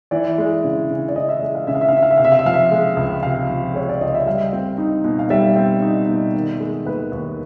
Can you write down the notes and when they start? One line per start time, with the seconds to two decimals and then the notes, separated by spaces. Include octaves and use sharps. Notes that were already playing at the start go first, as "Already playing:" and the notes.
0.11 E3 D5
0.38 G#3
0.64 C#3
0.90 C#3
1.09 D5
1.15 E3 D#5
1.29 E5
1.42 G#3
1.55 F5
1.67 C#3 E5
1.75 F5
1.81 E5
1.88 F5
1.93 C#3 E5
2.02 F5
2.11 E5
2.17 C3 F5
2.25 E5
2.32 F5
2.39 E5
2.46 F3 F5
2.54 E5
2.71 G#3
2.97 C#2
3.23 C3 F5
3.49 F3
3.74 G#3 C#5
3.89 D5
4.01 C#2 D#5
4.14 E5
4.26 G3 F5
4.53 C4
4.78 D#4
5.04 B2
5.19 F5
5.30 G3 E5
5.56 C4
5.82 D#4
6.08 B2
6.34 D#3
6.60 G#3
6.85 D#2 B4
7.12 D#2